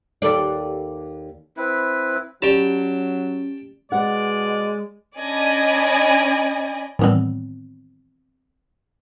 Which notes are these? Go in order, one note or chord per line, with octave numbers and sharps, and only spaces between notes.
D#2 A4 D5
C4 E4 B4
F#3 C#4 F4 G4 D5 G5 A5
B2 G#3 D5 F#5
C#4 D4 D5 D#5 G#5 B5
A2 D#3 E3 G3 B3 C4